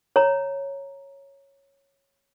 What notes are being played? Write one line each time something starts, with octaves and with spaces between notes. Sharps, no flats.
C#5 A#5